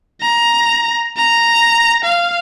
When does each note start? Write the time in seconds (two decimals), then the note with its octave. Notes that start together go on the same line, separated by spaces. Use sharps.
0.21 A#5
1.17 A#5
2.04 F5